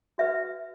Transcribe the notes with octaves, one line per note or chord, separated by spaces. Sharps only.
F#4 B4 E5